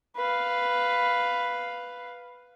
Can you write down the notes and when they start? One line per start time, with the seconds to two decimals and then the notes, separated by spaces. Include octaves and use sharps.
0.16 B4 F5